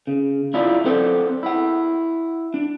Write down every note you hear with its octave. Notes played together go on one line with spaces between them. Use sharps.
C#3
D4 E4 F4 D5
C4 A4 C5 D5 F#5
E4 F#5
D4